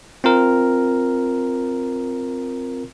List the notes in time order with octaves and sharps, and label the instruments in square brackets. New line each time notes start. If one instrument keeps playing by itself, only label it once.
[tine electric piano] C4 F4 A#4